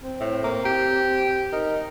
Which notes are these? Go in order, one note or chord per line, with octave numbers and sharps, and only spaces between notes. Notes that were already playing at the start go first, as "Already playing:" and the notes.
C4
A2
A#3
G4
D#4 A#4